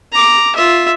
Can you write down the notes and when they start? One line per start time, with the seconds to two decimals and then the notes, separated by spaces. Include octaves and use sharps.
0.12 A#5 D6
0.55 F4 E5